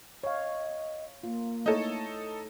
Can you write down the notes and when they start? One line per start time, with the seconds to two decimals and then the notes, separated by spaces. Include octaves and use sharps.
0.24 C#5 D#5 F5
1.23 A#3 F4
1.66 A3 D#4 E4 A4 C#5